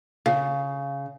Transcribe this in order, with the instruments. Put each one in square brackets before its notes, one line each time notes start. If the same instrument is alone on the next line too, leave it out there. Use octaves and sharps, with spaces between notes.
[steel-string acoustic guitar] C#3 [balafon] F5